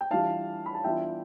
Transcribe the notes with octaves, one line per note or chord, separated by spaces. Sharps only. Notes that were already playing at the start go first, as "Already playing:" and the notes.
G5
E3 G3 D4 F4 F5 A5
B5
A5
E3 G3 B3 D4 F4 E5 G5